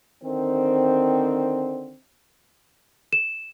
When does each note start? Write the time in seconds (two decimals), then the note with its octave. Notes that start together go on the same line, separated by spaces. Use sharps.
0.24 D3 D#3 C4
3.13 E7